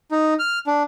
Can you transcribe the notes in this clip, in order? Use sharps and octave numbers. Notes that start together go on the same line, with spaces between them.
D#4
F6
D4